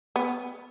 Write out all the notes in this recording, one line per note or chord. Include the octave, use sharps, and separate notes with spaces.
B3